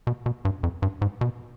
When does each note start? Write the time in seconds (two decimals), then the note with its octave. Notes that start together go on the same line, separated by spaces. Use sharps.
0.07 B2
0.26 B2
0.45 G2
0.63 F2
0.82 G2
1.02 G#2
1.21 B2